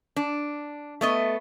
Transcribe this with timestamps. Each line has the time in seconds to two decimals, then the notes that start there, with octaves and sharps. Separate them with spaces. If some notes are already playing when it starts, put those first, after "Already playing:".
0.16 D4
1.01 A3 B3 D#5